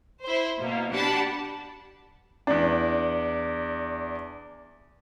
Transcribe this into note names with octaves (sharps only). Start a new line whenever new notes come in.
E4 C5
B2 A#3
D4 G4 F#5 A5 B5
E2 D4